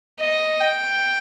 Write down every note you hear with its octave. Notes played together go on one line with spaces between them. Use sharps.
D#5
G5